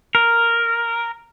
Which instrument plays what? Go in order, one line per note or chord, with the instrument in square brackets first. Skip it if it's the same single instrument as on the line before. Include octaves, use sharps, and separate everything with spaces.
[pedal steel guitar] A#4